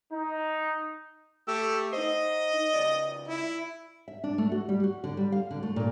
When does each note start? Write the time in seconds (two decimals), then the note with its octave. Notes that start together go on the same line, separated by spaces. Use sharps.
0.13 D#4
1.48 A3 G4 E6
1.93 D#4 C5 D#5
2.74 C#2 C#3 D5
3.28 E4
4.08 E5
4.24 D4
4.38 A3
4.52 F#4
4.69 G3
4.84 F#4
5.04 D3
5.17 G3
5.32 F5
5.51 D3
5.63 A3
5.76 A#2